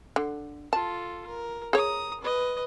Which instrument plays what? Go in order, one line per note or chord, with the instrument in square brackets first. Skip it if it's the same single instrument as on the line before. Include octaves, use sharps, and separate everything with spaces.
[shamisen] D3
[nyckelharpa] F4 A4 [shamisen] A5
[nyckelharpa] A#4
[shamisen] G#4 C#5 [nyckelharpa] A#5 D#6
[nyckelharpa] B4 D#5